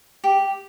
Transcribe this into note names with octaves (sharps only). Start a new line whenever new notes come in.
G4